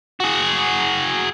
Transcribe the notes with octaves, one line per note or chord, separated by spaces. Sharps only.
F#4 G#4